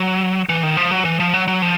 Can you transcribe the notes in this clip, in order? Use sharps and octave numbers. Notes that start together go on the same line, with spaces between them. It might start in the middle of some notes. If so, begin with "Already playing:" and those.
Already playing: F#3
E3
D#3
F3
F#3
E3
F3
F#3
F#3
F3